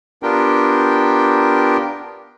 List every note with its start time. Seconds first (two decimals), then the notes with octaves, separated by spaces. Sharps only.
0.23 B3 D4 F4 G4 A#4 G5